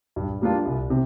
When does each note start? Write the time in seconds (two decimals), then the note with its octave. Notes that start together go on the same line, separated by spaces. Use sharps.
0.16 G2
0.41 G3 A#3 D4 F4
0.65 C2
0.90 C3